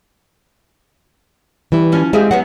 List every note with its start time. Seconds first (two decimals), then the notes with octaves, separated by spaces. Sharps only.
1.72 E3 G3 E4
1.92 F3 C#4
2.13 G#3 C4 G4 G#4 E5 F5
2.31 F#3 B3 C#4 F#5